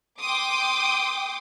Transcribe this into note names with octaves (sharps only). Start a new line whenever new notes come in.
G5 C6 D6 D#6